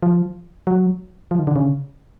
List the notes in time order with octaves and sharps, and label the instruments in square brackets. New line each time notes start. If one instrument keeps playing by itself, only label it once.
[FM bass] F3
F#3
F3
D#3
D3
C#3